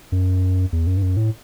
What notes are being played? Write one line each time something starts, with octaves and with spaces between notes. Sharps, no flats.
F#2
E2
F#2
G2
F#2
A2